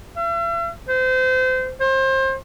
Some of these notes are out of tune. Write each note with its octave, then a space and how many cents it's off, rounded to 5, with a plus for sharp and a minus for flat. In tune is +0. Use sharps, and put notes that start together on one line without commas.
E5 +45
C5 -30
C5 +30